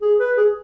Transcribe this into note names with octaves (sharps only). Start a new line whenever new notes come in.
G#4
B4
G#4